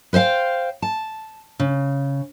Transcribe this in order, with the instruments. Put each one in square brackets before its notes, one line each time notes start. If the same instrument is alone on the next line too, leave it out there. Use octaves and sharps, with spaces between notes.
[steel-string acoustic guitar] B4 C5 E5 F5 G5
A5
C#3